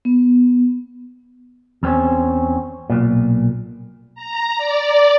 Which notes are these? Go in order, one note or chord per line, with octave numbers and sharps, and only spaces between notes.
B3
E2 C4 C#4
B1 A#2
A#5
D5